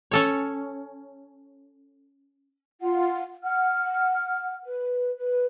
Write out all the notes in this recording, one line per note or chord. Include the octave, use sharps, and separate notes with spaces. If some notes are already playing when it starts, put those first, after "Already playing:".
C#4 A4 C#5
F4 F#5
F#5 F6
B4
B4